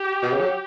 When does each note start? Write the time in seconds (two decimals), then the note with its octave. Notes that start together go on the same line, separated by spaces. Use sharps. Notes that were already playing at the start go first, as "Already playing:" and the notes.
Already playing: G4
0.23 B2
0.32 C#3
0.41 F#3